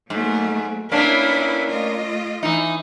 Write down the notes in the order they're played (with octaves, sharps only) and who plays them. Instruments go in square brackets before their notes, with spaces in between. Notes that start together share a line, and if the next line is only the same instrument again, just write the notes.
[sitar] G#2 [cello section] F#3 A3 A#3
[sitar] A#3 C#4 D4 [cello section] E4 B4
[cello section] A3 F4 D#5
[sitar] E3 D#4